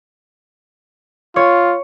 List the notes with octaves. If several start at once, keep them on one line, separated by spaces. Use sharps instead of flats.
F4 C#5